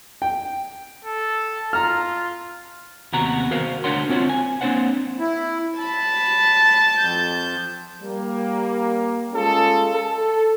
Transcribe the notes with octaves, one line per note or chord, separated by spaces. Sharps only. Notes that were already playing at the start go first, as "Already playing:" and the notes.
G5
A4
F4 A#5 F6
D#2 C3 B3 F#4 A#5
F#4 A#4 C5 F5
D2 D4 A#4 C#5 F#5 C6
C4 F4 F#4 C5 C#5
G#5
A#3 C4 D4 C5 C#5 F#5
E4
A5 B5
F2 G6
G3 A#3
G#3 C#4 F4 G#4 A4
A4